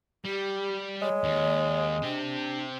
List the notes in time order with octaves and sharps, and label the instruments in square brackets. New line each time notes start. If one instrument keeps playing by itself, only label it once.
[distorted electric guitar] G3 [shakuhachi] G4
[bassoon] G#3 [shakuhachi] C#5
[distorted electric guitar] D#2
[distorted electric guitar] C4 G4 [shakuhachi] D4